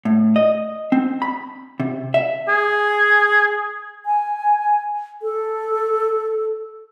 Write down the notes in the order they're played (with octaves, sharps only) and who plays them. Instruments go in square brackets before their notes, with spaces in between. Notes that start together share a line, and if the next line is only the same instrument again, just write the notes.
[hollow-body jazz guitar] A2
D#5
C4
B5
C3
E5
[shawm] G#4
[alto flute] G#5
A4